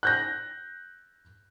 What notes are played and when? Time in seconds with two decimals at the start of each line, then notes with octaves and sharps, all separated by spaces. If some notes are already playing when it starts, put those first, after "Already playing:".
0.03 F#6 G6 A#6